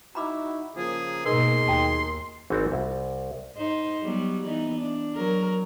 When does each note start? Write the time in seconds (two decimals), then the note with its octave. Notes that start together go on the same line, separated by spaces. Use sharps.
0.15 D#4 E4 F#4 A#5 B5 D6
0.76 C#3 F3 A#3 G#4
1.26 G#2 B2 A#3 D#4 G#4 A#4 C6
1.68 D#2 F#4 G5 A5
2.50 G#1 E3 C4 F#4 D5 F#5
2.72 C2
3.56 G#2 D#4 C5
4.01 F#3 G3 B3
4.45 E3 B3 D#4
4.79 D4
5.15 F#3 A#4